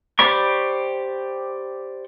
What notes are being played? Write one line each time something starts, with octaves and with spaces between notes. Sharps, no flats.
G4 C5 D5 B5 C#6